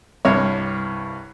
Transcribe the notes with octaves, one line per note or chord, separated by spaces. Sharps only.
C2 G2 C#5